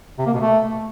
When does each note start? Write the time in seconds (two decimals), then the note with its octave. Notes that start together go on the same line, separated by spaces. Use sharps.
0.19 C3
0.26 A#3
0.33 B2
0.41 A3